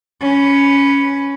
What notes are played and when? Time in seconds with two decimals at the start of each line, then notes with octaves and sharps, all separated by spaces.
0.21 C#4 B4